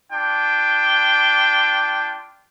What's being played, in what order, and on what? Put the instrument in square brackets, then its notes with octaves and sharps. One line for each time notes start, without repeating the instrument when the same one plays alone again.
[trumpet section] D4 F4 G5